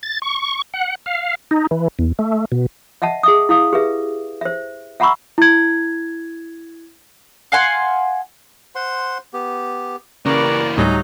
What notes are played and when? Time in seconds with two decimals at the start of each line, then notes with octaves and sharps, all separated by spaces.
0.03 A6
0.22 C#6
0.74 F#5
1.06 F5
1.51 D#4
1.71 E3
1.99 E2
2.19 A3
2.52 B2
3.02 D#5 E5 F#5 A5
3.23 G#4 E5 D#6
3.49 E4 F5 D#6
3.73 G4 G#4 B4 E5
4.41 C5 E5
5.00 E5 F#5 A#5 B5 C#6 E6
5.38 E4 G#6
7.52 F5 F#5 G#5 C6
8.75 C5 F#5 C6
9.33 B3 G4
10.26 C#3 E3 A#3 G4 A#4 B4 D5 C#6
10.77 D2 A2 F#3 G3 D#4 G#5 A#5